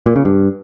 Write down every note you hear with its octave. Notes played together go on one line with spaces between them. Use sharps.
A#2
C#3
G2